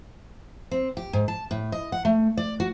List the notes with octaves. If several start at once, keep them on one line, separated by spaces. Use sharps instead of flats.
C4
G4
G#2
A5
A2
D#5
F#5
A3
D5
F#4